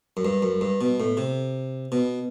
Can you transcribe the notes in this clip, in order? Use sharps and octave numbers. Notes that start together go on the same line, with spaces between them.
F#2
G2
F#2
G2
B2
A2
C3
B2